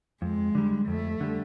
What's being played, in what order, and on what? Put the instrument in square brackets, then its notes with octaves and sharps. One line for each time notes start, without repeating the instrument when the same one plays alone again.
[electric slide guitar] F2 [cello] G#3
[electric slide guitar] D3 G3
[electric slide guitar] F2 [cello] A3
[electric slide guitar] D3 G3